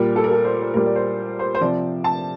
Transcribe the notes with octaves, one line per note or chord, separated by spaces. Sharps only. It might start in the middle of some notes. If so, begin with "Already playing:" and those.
Already playing: A#2 G3 A#4
A4
A#4
A4
C5
C5
A#2 G3 A#4
D5
C5
C5
C5
C3 F3 D5
A5